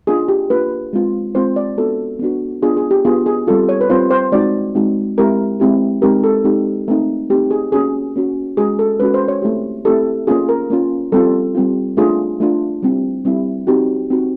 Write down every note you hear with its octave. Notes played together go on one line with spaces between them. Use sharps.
A#3 D4 F4 G#4
G4
A#3 D4 F4 B4
G#3 C4 F4
G#3 C4 F4 C5
D5
B3 D4 F#4 A4
B3 D4 F#4
B3 D4 F4 G#4
G#4
G4
B3 D4 F4 G#4
G#4
G3 C4 F4 A4
C#5
B4
G3 C4 F4 C5
C5
G#3 C4 D#4 F#4 D5
G#3 C4 D#4 F#4
G#3 C4 E4 G4 A#4
G#3 C4 E4 G4
G#3 C4 D#4 G4 A#4
A4
G#3 C4 D#4 G4
A3 C4 D#4
A3 C4 D#4 G4
G#4
A#3 C#4 F#4 G#4
A#3 C#4 F#4
G#3 C#4 F#4 G#4
A4
G#3 C#4 F#4 B4
C5
C#5
A3 C4 E4 G4
A3 C4 E4 G4 A4
A#3 C#4 F4 G#4
A#4
A#3 C#4 F4
G3 C4 F4 A4
G3 C4 F4
A3 D4 F4 G#4
A3 D4 F4
G3 C4 E4
G3 C4 E4
C4 D#4 F#4 G4
C4 D#4 F#4